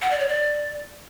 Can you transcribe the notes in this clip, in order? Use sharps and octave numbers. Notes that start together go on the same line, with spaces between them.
F#5
D5
C#5
D5